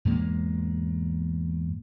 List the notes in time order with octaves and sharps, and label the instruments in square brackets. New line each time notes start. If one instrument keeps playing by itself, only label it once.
[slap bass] E2 G#2 G#3 A#3